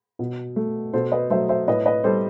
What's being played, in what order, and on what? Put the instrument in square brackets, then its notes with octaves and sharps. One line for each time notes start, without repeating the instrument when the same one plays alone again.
[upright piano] B2
A3
B2 A4 C5
B4 D#5
F#3 A3 C5 E5
C5 E5
A2 B4 D#5
B4 D#5
G3 A4 C5